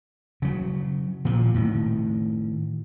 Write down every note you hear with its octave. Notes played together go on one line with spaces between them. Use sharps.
C#3 F#3
A#2 C#3 F3
A2 D#3